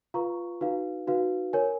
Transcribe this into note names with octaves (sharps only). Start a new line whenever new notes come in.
F4 B4 F5 A#5 C#6
D#4 F#4 B4 F5
D#4 F#4 B4 F5
A#4 C#5 G#5